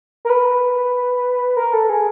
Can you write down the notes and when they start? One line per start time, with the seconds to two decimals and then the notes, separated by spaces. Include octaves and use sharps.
0.25 A#4
0.30 B4
1.57 A#4
1.73 A4
1.89 G#4